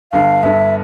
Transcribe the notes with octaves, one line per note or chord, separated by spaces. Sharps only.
G1 G2 D3 F5
G1 G2 D3 E5